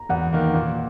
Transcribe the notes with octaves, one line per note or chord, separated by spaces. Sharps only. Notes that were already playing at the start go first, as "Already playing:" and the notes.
Already playing: A#5
E2 F#5
D#3 A#3
A#2